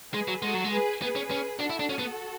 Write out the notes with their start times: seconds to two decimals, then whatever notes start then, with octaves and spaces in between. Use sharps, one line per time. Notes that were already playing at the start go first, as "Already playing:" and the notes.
0.13 G#3 G#4 B4
0.28 F#3
0.42 G#3 F#4 A4
0.54 F#3
0.64 G#3
0.72 G#4 B4
1.01 B3 G#4 B4
1.16 C#4
1.31 C#4
1.60 D4 F#4 A4
1.70 E4
1.79 D4
1.90 C#4
1.99 B3